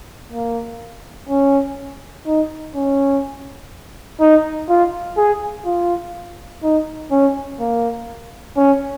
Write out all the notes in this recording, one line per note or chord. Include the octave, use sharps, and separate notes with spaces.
A#3
C#4
D#4
C#4
D#4
F4
G#4
F4
D#4
C#4
A#3
C#4